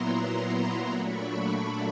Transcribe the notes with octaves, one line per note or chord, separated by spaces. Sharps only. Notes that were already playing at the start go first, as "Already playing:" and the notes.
Already playing: A#2 F#3 B3 E4 A#5 C6
A#5 C6
A#2 F#3 A3 D4 B5 C#6